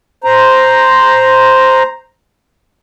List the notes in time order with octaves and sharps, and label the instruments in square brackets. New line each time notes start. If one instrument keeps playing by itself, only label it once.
[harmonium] C5 A#5